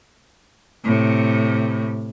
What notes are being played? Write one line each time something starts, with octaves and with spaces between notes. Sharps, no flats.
A2 C3